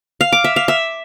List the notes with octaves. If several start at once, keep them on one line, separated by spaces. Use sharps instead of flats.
F5
D6
E5
F5
E5